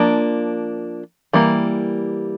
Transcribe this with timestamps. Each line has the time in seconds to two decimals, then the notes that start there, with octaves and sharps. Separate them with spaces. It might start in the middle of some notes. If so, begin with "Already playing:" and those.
Already playing: F3 A#3 D4
1.33 E3 G3 A#3